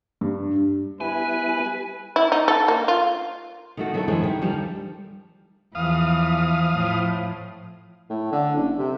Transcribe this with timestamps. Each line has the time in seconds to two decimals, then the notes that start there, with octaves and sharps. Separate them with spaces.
0.21 G2
1.01 G3 B3 E4 B4 G#5
2.16 E4
2.32 D#4
2.48 A4
2.68 A#3
2.88 F4
3.77 D#3 A3 F#4
3.94 D#3 F#3 A#3 E4 A4 A5
4.08 F#2 E3 G#3 E4 C5
4.23 D#3 E4
4.41 D2 F3 G3 A#4
5.75 E2 E3 F3 F5 D#6
6.75 A2 F3
8.10 A2
8.32 D3
8.55 F#1
8.78 C3